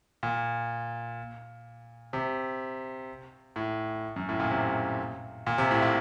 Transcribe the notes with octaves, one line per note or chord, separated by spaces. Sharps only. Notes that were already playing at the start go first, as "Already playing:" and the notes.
A#2
C3
A2
F#2
A2
A#2
C3
A#2
C3
A2
A#2